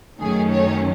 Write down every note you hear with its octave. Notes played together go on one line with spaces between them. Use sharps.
F#2 D#3 F#3 A3 C#4 G#4
C#5